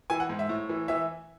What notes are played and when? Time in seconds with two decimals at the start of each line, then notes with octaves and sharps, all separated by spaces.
0.10 E3 G#5
0.20 F#5
0.29 G#2
0.39 E5
0.49 A2
0.69 E3
0.88 E3 E5